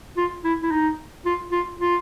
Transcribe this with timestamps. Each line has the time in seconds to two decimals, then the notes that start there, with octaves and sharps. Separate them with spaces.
0.17 F4
0.44 E4
0.62 E4
0.71 D#4
1.25 F4
1.52 F4
1.79 F4